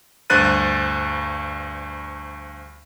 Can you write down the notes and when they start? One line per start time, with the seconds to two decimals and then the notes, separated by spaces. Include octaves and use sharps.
0.30 D2 G2 C5 F#6 A6 D#7